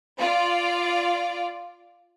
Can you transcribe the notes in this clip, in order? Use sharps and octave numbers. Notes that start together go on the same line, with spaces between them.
F4 D5